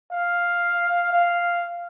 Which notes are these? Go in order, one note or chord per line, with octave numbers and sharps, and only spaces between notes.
F5
F5